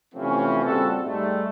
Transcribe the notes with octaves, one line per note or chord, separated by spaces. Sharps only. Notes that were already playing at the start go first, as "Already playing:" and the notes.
C3 E3 F3 A3 C4 C#4
A#2 C#3 G3 C4 F#4 A4
G#2 G3 A3